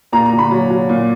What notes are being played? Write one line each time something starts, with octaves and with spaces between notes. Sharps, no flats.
A#2 A#5
A#5
A#2
B5
F#3
F#3
A#2